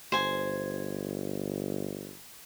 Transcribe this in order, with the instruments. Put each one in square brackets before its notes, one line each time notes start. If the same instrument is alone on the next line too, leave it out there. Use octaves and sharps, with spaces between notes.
[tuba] G1 [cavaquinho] C5 G#5